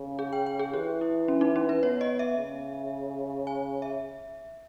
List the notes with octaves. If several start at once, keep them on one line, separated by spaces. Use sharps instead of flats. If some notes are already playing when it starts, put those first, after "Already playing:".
Already playing: C#3
G#4
G5
G5
G#4
E3 G4
E4
C#4
D#4
C#4
B4
B3 C#5
D#5
E5
C#3
G#5
E5